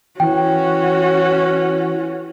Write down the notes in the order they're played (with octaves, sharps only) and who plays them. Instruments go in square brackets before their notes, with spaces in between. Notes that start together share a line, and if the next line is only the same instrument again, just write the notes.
[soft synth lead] E3 [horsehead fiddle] C#4 F#4 [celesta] G5